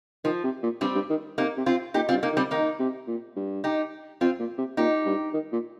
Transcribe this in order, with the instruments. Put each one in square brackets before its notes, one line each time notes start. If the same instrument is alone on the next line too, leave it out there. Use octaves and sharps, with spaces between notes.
[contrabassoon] D#3 [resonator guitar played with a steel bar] F3
[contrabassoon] C3
A#2
[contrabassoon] G2 [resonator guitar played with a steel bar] G3 C4
[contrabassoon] G2
D#3
[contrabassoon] C3 [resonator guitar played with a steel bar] A#3 D#4
[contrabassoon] C3
[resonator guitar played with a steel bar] C4 F4
[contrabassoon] A#2 [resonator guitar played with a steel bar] D#4 G4
[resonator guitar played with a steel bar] C4 F4
[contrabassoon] G2
[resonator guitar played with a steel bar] A#3 D#4
[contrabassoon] D#3
[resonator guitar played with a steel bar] G3 C4
[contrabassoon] D#3 [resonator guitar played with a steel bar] A#3 D#4
[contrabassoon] C3
A#2
G2
[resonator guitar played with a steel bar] D#4 G4
[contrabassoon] F2 [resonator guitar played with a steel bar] C4 F4
[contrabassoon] A#2
C3
[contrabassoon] A#2 [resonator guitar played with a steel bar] D#4 G4
[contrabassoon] G2
D#3
A#2